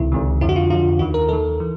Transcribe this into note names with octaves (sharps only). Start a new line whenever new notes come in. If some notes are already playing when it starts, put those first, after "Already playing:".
Already playing: C#2 C3 D#3 E4
C#2 C3 D#3
F2 D3 E4
F#4
F4
F2 D3 F4
D#2 D#3 F#4
A#4
D#2 D#3 A4
E3